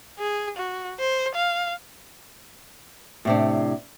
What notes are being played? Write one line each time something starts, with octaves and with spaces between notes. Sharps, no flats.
G#4
F#4
C5
F5
A2 C3 D4